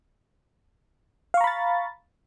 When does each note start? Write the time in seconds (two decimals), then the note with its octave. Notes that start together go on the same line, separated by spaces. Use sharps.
1.34 F5
1.37 C#6
1.41 A#5
1.44 B5
1.47 A6